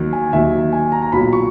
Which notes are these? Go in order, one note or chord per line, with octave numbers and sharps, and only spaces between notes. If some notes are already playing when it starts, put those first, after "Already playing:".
Already playing: D#2 D#3 F#3
G#5
D#2 D#3 F#3 E5
G#5
A#5
A#5
B1 A#2 F#3 B5
C#6